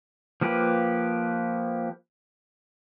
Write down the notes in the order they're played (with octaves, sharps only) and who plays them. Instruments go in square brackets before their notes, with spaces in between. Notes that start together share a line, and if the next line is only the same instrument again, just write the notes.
[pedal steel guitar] F3 A#3 G4 B4